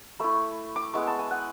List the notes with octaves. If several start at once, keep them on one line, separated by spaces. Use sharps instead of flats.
A3 E4 B5
D6
G#3 B3 E4 C#6
A5
G#5
F#5